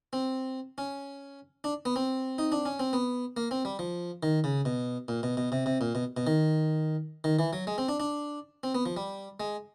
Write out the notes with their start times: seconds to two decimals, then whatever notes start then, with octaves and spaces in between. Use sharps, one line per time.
0.13 C4
0.78 C#4
1.64 D4
1.85 B3
1.96 C4
2.38 D#4
2.52 D4
2.66 C#4
2.80 C4
2.93 B3
3.37 A#3
3.51 C4
3.65 G3
3.79 F3
4.23 D#3
4.44 C#3
4.65 B2
5.08 A#2
5.23 B2
5.37 B2
5.52 C3
5.66 C3
5.81 A#2
5.95 B2
6.17 B2
6.27 D#3
7.24 D#3
7.39 E3
7.53 F#3
7.67 G#3
7.78 C4
7.88 D4
8.00 D4
8.63 C4
8.74 B3
8.86 F3
8.96 G3
9.40 G#3